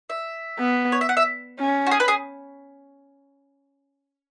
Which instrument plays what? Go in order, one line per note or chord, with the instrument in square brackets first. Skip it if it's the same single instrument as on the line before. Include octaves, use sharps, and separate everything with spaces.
[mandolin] E5
[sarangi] B3
[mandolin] C#5
E5
F#5
E5
[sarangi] C#4
[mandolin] F#4
G#4
B4
G#4